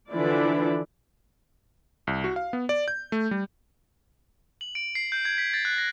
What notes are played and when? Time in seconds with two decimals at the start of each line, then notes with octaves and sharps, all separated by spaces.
0.12 D3 E3 F3 D4 E4 D5
2.07 C2
2.24 F#4
2.36 F5
2.53 B3
2.69 D5
2.88 G6
3.12 A3
3.31 G3
4.61 F#7
4.75 D7
4.95 C7
5.12 G6
5.25 G#6
5.38 B6
5.54 A6
5.65 F#6
5.78 A#6